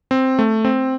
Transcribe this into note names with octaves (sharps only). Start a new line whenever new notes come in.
C4
A3
C4